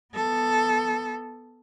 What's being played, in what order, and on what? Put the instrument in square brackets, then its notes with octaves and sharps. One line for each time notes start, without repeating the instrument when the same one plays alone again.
[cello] B3 A4